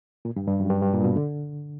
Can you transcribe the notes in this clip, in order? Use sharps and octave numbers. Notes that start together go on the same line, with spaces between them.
A#2
G2
G2
F#2
G2
G2
A#2
B2
D3